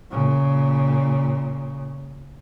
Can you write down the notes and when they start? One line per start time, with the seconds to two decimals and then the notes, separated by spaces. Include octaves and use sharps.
0.10 A#2 C#3